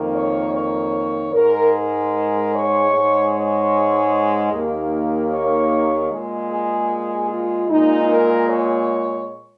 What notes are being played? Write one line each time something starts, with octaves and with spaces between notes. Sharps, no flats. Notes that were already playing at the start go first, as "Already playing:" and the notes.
Already playing: F2 D#3 A#3
C#5
C#5
G#2 G#3 A#4
A#4
C#5
G#2 G#3
C#5
D#2 D#3 A#3
C#5
A#2 G#3
G#4
F4
A#2 G#3 D#4
A#4
C#5